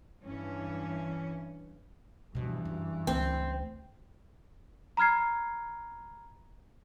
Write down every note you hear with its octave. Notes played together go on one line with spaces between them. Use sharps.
G2 E3 C#4
G2 B2 E3 F3
F#2
C#2 A3 C4
A#5 B5 F6 G#6 C7